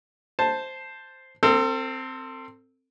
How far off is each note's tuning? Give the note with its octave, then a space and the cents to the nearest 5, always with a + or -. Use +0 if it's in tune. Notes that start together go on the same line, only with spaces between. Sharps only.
C5 +0 A5 +0
C4 +0 A4 +40